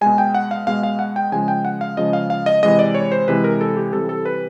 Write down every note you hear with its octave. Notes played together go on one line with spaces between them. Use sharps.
B2 G#3 G#5
G5
F#5
F5
B2 G#3 F5
F5
F#5
G5
C#3 F3 G#3 G#5
G5
F#5
F5
C#3 F3 G#3 D#5
F5
F5
D#5
C3 E3 G#3 D#5
D5
C#5
C5
C3 E3 G#3 B4
A#4
A4
G4
C3 E3 G3 A4
A4
B4